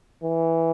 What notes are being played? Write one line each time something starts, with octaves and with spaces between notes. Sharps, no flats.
E3